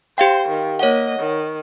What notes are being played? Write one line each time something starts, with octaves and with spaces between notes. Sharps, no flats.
G4 C5 F5 G5
D#3
A#3 C#5 D#5 F#5
D#3